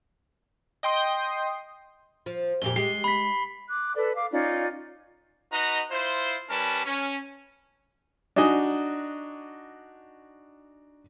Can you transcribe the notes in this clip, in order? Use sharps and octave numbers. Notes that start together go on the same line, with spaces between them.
D#5 G5 C6 D#6
F3
F2 A#2 G4 G7
G#3 G4 C7
B5 B6
D6 F#6
A4 B4 D5
F5 D6
C#4 D#4 F4 D5
D#4 F#4 B4 D#5 A#5
E4 F4 C5
G3 C#4 A#4 B4 A5
C#4
D4 D#4 F#4 D#5 G#5